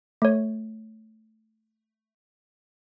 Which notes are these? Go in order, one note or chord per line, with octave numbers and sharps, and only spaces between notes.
A3 C#5